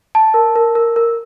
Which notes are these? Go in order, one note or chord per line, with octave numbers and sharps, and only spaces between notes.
A5
A#4
A#4
A#4
A#4